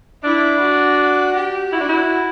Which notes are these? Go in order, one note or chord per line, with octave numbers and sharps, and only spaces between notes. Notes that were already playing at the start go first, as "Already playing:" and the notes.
D4 E4
F#4
G4
E4 F#4
D4
E4